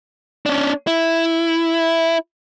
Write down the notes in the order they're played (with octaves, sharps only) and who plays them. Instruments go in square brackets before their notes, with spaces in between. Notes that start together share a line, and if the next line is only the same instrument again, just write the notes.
[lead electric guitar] C#4 D4
E4